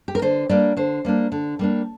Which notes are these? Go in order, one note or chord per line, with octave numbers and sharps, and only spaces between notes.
G4
A#4
D3 C5
G3 A#3 D4 D5
D3 C5
G3 A#3 D4
D3
G3 A#3 D4